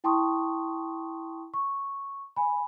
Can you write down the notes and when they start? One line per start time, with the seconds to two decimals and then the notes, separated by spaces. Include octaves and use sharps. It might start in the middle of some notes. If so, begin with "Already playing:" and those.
0.04 E4 G5 A5 C6 C#6 D#6
1.54 C#6
2.36 G#5 B5